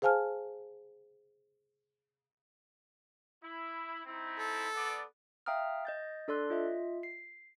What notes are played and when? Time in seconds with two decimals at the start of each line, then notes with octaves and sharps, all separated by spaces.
0.02 G#4 C5 F5 G#5 A5 F6
3.43 E4
4.05 C4 D#4 E4
4.38 A4
4.75 B3 D5
5.46 E5 F5 G5 A#5 D#6 F6
5.85 D#5 G6 A6
6.28 D4 A4 D5 C6 F#6
6.50 F4 D#5 E5
7.03 C7